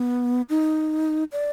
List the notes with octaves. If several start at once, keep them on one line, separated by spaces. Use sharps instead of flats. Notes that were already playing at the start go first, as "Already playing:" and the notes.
Already playing: B3
D#4
D5